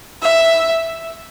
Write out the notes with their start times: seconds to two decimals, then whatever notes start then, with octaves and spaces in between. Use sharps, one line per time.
0.22 E5